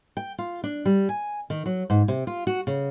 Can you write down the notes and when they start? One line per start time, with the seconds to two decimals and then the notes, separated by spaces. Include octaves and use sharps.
0.17 G5
0.38 F4
0.64 D4
0.86 G3
1.09 G#5
1.50 D#3
1.66 F#3
1.90 G#2
2.08 C3
2.27 F4
2.47 F#4
2.67 C#3